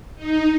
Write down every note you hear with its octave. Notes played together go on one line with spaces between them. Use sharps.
D#4